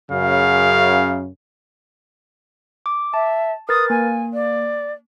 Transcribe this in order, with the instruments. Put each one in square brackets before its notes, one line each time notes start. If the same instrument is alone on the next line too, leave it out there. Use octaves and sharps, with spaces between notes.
[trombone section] F#2 C#3 [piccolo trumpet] F5
[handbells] D6
[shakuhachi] E5 [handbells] A5
[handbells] A#4 B4 A6 [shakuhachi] D#6
[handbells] A#3 [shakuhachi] G#5
[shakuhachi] D5